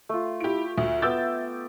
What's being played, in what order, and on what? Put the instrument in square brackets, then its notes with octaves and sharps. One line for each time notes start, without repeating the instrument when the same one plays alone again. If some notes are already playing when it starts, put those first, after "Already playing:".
[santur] A3 F4
[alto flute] E4 [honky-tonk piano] G4 D7
[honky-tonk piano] D2 [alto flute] E5
[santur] B3 G5 D6 [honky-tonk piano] E6 G6 A6